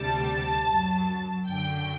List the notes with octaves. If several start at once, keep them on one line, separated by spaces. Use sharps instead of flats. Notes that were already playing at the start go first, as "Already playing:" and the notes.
Already playing: D2 C3 G3 A5
F#2 F#3
F#2 D3 F#3 G5